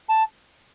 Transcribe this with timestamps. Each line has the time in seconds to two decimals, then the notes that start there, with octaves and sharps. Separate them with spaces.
0.09 A5